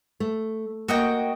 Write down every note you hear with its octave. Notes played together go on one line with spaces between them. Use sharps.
A3
A#3 F#4 D#5 G5